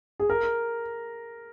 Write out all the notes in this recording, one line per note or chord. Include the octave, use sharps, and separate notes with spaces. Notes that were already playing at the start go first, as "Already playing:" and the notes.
G#4
A#4